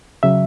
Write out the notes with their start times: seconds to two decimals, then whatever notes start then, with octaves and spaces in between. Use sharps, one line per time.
0.23 C#3 F#3 E5